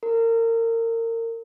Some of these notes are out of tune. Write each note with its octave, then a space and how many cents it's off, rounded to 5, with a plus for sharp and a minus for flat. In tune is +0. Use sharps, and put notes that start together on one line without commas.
A#4 -30